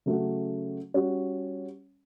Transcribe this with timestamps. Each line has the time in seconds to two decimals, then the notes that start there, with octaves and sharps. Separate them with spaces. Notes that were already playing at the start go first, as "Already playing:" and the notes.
0.06 C#3 F#3 A3 C#4 F#4
0.94 G3 C#4 F#4 C#5